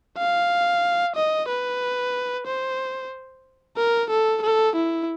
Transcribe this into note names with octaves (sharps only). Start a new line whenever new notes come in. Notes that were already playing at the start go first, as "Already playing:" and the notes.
F5
D#5
B4
C5
A#4
A4
A4
E4